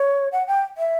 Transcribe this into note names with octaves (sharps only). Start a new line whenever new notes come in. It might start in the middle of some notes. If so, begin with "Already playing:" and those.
Already playing: C#5
F#5
G5
E5